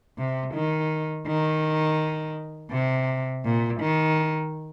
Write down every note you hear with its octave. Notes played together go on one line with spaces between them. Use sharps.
C3
D#3
D#3
C3
A#2
D#3